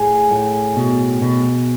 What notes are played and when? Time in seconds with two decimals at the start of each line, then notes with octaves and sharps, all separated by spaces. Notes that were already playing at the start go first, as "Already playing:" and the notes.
Already playing: A2 G#4
0.31 A2
0.76 B2
1.21 B2